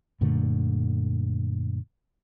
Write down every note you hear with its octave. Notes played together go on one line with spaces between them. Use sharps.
F#2 A#2 D3 A3